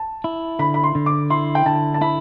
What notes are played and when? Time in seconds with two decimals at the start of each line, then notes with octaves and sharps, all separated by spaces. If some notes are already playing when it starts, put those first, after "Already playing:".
Already playing: A5
0.24 E4
0.59 D3 B5
0.74 B5
0.84 C6
0.95 D3
1.06 D6
1.30 E4 C6
1.55 G5
1.66 D3 A5
1.94 A5
2.01 E4 B5